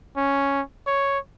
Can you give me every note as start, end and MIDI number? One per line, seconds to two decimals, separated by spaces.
0.17 0.62 61
0.87 1.19 73